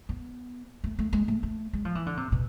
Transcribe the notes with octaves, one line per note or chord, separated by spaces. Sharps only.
B3
A3
A3
G#3
A3
A3
G#3
F3
E3
D3
C3
B2